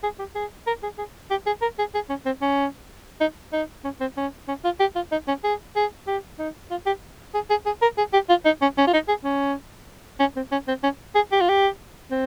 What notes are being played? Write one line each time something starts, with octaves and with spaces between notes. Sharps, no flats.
G#4
G4
G#4
A#4
G#4
G#4
G4
G#4
A#4
G#4
G#4
C#4
C4
C#4
D#4
D#4
C#4
C4
C#4
C#4
F4
G4
F4
D#4
C#4
G#4
G#4
G4
D#4
F4
G4
G#4
G#4
G#4
A#4
G#4
G4
F4
D#4
C#4
C#4
F4
D#4
G#4
C#4
C#4
C4
C#4
C4
C#4
G#4
G4
F4
G4
C4